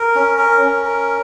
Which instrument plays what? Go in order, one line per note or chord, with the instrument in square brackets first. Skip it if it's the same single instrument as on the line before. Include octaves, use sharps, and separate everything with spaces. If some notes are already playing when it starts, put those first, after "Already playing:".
Already playing: [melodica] A#4
C#4
A#4
C#4
A#4